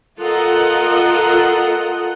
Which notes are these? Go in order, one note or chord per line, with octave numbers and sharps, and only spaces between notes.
F4 A4 A#4 D#5 F#5